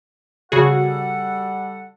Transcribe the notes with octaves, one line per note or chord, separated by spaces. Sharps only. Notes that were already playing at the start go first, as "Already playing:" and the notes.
C#3 G3 F#4 G#4 A4 F#5